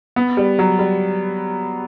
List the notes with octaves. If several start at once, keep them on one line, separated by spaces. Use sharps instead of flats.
B3
G3
F#3
G3